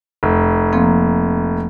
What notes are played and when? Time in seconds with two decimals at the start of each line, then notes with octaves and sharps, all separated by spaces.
0.23 F1
0.73 F3 A#3 C4